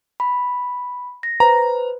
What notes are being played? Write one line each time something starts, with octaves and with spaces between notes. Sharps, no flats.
B5
A#6
B4 C5 A#5